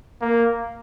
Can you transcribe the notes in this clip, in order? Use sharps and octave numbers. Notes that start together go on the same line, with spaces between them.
A#3